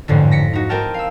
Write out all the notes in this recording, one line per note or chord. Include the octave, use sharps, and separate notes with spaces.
A1 F2 G#2 D3
A#6 B6 C#7
D#4 F#4
C4 A#4 D#5 G5 A5 F6
F5 E6